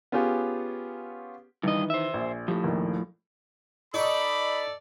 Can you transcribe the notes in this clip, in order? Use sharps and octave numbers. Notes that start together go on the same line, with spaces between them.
B3 C#4 F4 G4 G#4
G2 D#3 E3 D#5
C5 E5
A#1
A2 F3 G4
A#1 D#2
D#4 A4 D5 B5 C#6